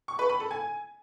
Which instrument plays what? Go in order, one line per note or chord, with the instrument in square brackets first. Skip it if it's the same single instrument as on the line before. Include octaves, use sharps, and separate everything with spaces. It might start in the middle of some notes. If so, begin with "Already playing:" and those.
[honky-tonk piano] C#6
B4
B5
A4
G#5